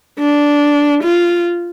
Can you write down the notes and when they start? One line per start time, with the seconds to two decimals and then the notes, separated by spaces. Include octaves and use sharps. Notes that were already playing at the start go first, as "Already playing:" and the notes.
0.19 D4
1.03 F4